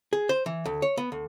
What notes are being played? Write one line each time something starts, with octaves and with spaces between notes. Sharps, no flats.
G#4
C5
E3
D2
C#5
B3
D2